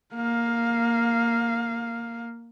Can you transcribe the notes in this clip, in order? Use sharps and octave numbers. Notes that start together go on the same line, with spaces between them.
A#3 F5